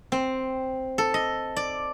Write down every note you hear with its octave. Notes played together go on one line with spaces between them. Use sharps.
C4
A4
D#5
D5